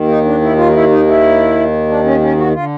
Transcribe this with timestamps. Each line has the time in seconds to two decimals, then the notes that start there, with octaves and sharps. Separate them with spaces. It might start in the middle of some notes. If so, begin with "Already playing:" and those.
Already playing: D#2 D#3
0.08 D#4
0.25 D4
0.41 E4
0.57 F4
0.69 D#4
0.73 E4
0.90 D#4
1.07 E4
1.89 D4
2.04 C#4
2.21 C#4
2.37 F#4
2.53 D3 F4